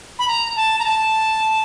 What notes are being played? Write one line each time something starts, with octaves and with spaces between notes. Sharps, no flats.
B5
A#5
A5
A#5
A5